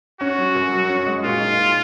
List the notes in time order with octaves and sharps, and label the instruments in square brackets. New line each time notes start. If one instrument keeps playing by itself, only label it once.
[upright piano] C#4 [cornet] F#4
[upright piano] F#3
F#2
F#3
C#4
G#3
[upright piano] A#2 [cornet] F4
[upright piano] D#4
A#2